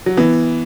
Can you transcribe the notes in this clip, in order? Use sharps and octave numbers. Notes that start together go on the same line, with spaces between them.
F#3
E3 B3